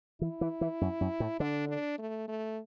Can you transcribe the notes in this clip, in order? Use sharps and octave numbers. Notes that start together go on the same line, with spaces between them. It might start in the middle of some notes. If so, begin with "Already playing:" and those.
E3 E4
E3
E3
F#2
F#2
A2
D3 D4
D4
A3
A3